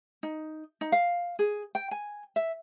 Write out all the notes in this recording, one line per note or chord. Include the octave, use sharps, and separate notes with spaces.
D#4
D#4
F5
G#4
G5
G#5
E5